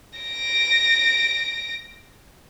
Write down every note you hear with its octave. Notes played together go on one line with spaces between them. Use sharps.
A#6 D7